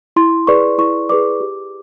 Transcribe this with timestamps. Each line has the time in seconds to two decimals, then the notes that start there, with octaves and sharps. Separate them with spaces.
0.16 E4 C6
0.47 G#4 B4 D5 C#6
0.78 E4 C#6
1.09 G#4 B4 D5 D6
1.40 G4